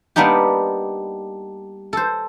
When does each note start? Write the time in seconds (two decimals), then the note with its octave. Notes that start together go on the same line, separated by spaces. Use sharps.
0.16 G3 A#3 B3 D4 D#4 G4
1.93 A4 C5